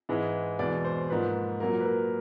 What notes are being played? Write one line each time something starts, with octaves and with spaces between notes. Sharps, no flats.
G#2 E3 G#3
E2 B2 G#3 D5
C5
G#2 F3 A#3 B4
A#2 F#3 A#3 A#4
B4
A#4